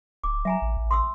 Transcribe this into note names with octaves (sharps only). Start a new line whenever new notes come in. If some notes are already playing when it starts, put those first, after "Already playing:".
D1 D6
F#3 E5 G#5 A#5
A1
A1
C6 D#6 E6